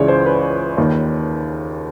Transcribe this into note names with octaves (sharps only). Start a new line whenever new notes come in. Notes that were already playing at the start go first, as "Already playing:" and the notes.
Already playing: C#2 C#3 E3 C#5 D5
C5
B4
D#2 D#3